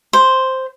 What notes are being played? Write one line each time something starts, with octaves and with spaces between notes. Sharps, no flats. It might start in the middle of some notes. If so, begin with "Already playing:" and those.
C5